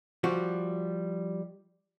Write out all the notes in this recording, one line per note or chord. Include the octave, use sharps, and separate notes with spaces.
F3 G3 F#4